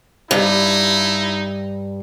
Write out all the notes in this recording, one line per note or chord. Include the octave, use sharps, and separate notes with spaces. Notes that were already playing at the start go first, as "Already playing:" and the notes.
G2 D#4 E4